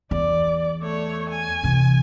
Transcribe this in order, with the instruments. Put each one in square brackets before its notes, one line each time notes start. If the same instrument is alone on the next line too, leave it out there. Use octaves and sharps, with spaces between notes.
[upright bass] E2 [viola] D5
[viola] A3 C#5
G#5
[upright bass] C3 E3